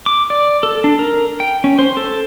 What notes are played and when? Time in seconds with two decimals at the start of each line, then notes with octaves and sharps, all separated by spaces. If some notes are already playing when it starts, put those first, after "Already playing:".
0.06 D6
0.30 D5
0.63 A4
0.84 D4
0.99 A#4
1.40 G5
1.64 C#4
1.79 C5
1.97 A4